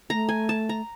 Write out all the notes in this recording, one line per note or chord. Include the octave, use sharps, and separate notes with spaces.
A3 A#5
G#5
A5
A#5